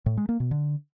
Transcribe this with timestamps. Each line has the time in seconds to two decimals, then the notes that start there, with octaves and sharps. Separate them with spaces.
0.06 A2
0.17 G#3
0.29 A#3
0.40 B2
0.51 D3